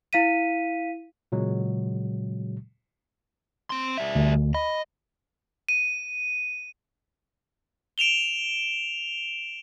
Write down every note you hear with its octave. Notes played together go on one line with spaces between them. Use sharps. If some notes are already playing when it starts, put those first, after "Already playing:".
E4 F5 B6 D#7
A#2 C#3 F#3 G#3
C4 C6
G3 E5
D2
D#5 B5
D#7
D7 E7 F7 G7